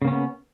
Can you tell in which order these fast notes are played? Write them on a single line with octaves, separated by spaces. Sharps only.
C#3 A#3 C#4 B3